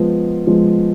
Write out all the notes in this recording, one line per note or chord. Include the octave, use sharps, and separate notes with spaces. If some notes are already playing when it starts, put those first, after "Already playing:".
Already playing: F3 G#3 B3
F3 G#3 B3